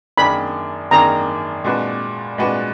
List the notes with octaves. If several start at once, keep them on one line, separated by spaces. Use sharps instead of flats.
F#2 D#3 A#3 D4 G#4 B5
F#2 D#3 A#3 D4 G#4 A#5
A#2 G#3 D4 F#4 B4
A#2 G#3 D4 F#4 B4